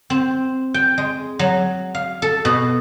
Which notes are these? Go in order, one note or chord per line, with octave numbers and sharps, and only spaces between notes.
C4
G5
G#3
F#3
F5
A4
B2